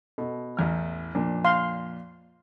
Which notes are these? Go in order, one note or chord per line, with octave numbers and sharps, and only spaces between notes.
B2 A4
A1 E2 F6
F2 A#2 D4
F5 C6